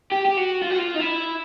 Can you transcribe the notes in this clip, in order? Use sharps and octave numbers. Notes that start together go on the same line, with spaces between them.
G4
G4
F#4
F4
F#4
F4
D#4
E4